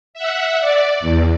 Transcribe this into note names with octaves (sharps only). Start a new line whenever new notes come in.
E5 F#5
D5
E2